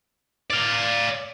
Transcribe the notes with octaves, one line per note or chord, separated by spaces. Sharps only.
D5 F5